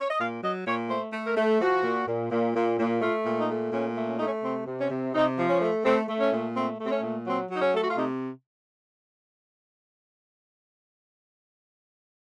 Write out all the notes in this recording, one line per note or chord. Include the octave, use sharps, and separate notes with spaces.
C#5
D#5
A#2 F5
F#3 D#5
A#2 C#5
A3 C5
A3
A#4
A3
F3 F#4
A#2
A#2
A#2
A#2
A#2
A3 F4
A#2
D#4
A3
A#2 C#4
A3
C#4
A3 D#4
C#4
C3 C4
C3
C#4
C3
C3 D#4
F3
C#4
A3
A3 C4
A3
C#4
A#2
A3 C4
A3 C4
C#4
A#2
F#3 C4
F#3 D#4
C#4
A3 A4
F#4
F4
C3 D#4